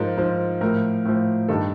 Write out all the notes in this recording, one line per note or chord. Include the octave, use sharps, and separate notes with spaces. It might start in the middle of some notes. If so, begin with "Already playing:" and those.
Already playing: G#2 F3 A#4
G#2 F3
A2 F3 A#4
A2 F3
G2 D#3 A4